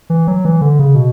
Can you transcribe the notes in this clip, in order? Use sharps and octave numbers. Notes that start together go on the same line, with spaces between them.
E3
F#3
E3
D3
C#3
B2